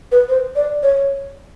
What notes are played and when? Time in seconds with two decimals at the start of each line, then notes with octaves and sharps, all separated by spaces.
0.12 B4
0.29 C5
0.56 D5
0.83 C#5